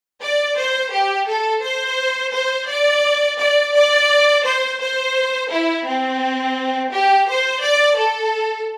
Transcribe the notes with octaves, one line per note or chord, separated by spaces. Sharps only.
D5
C5
G4
A4
C5
C5
D5
D5
D5
C5
C5
E4
C4
G4
C5
D5
A4